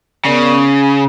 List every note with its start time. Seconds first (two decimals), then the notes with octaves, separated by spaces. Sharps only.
0.25 C#3 B3 A#4 D5
0.53 C#4